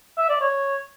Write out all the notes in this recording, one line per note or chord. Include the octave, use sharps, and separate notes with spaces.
E5
D5
C#5